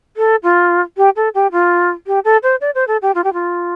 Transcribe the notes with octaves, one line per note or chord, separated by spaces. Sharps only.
A4
F4
G4
A4
G4
F4
G4
A4
C5
D5
C5
A4
G4
F4
G4
F4